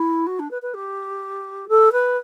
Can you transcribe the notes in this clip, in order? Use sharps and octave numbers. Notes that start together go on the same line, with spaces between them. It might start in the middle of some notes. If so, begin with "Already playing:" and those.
Already playing: E4
F#4
D4
B4
B4
G4
A4
B4